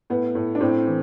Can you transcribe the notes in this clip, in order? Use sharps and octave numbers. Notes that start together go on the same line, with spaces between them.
A2 B3
A2
D4
A2 C4
E3